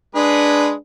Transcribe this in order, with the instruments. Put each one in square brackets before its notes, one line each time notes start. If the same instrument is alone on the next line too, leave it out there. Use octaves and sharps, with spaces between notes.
[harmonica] G#3 G#4 B4 [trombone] D4